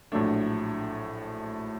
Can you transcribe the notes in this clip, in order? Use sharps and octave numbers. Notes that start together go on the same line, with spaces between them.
A#1 A2 F#3 A3 D4